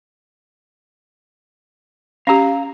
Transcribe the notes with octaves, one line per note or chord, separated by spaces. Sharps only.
C#4 G4 F5 A#5